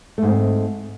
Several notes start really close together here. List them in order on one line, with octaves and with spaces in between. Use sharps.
A3 G#2 C4